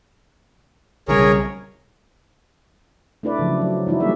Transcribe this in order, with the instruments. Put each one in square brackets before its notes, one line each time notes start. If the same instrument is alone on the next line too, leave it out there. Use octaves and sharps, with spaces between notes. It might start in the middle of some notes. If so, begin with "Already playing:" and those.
[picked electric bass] B1 C#3 G3 [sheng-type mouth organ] G#4 A#4 C#5
[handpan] A3 D4 E4 B4 D5
C#3 F3 F#3
F#3
E3 G#3 D#4 E4 F#4
F#3 G3 A#3 G#4 D5 E5